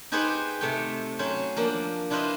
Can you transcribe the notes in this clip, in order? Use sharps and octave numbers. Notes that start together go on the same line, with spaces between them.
D#4 G4 G#4 B4 C5 F#5
C3 A3 G5
F#3 C#4 C5
F3 A#3 D4
D4 E4 F4 B4 C5 D#5